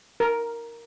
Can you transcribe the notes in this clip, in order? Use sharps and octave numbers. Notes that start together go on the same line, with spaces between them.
A#4